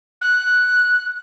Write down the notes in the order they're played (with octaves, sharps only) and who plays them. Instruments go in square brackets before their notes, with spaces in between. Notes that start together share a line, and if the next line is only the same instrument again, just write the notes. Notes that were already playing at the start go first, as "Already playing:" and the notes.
[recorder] F#6